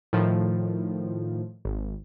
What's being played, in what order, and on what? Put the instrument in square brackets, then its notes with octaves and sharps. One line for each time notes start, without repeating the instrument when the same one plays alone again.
[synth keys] A2 D#3 F3
G#1